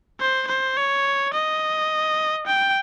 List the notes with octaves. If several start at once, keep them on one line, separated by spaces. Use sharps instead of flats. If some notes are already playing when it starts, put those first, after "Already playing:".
C5
C5
C#5
D#5
G5